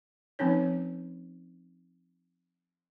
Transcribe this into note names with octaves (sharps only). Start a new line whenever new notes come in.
F3 C4 C#4 D#4 C#5